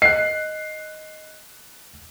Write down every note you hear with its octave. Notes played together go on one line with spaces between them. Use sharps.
D#5 F#6 C7